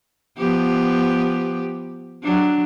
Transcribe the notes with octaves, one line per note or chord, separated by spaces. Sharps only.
F3 B3 G4
F#3 D4